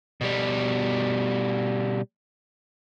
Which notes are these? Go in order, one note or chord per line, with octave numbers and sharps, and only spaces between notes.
B2 G3